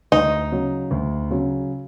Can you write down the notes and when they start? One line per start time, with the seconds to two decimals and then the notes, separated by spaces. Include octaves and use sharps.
0.12 D2 D#4
0.52 C#3 F#3
0.91 D2
1.31 C#3 F#3